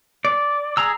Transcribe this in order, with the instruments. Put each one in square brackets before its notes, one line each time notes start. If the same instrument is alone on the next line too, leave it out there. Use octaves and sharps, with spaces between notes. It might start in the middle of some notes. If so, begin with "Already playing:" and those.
[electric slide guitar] D5
[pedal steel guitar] G#4 A#5 E6